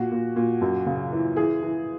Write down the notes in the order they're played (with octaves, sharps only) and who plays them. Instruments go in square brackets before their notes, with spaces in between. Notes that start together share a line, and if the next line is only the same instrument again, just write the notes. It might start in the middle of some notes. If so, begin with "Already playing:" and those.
Already playing: [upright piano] A#2 F#4
A#2
A#2
F#2
C#3
E3
E3 G#4
E3